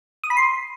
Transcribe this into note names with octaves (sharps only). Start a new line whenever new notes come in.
D#6
B5
C6